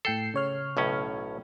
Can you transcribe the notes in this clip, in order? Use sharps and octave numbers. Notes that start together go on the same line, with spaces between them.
A2 A4 G5 C7
C#3 C#5 F6
B1 A2 C#4